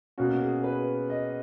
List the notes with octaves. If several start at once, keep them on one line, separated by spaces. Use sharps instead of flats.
B2 A#3 C#4 F#4
G#4
B4
D#5